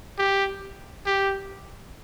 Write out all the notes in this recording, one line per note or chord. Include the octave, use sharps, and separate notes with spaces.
G4
G4